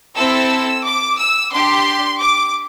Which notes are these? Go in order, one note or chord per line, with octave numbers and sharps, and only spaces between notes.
C4 E4 A4 E6
D6
E6
D4 G4 C6
D6